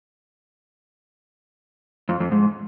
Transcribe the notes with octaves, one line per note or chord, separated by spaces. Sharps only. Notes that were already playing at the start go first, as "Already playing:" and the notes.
F2
F2
G#2